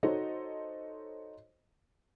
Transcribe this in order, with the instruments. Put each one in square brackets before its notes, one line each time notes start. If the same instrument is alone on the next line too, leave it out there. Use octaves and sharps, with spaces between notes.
[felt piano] D#4 F#4 A4 C5 C#5 D#5